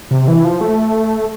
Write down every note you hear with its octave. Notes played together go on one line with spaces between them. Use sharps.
C3
E3
F3
A3